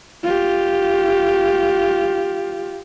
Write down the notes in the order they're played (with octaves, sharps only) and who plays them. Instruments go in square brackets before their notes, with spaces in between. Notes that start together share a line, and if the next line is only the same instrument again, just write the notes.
[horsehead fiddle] F4 G4